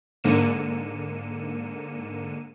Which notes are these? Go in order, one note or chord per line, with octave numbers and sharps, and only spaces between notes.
G#2 D3 A#3 C#7 D#7 E7